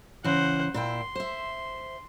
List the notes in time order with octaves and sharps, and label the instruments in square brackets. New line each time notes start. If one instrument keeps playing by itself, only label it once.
[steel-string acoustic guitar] C#3 E3 [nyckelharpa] C5 F#5
[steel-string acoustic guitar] A#2 E4 G5 [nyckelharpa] C6
[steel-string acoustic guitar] C5 E5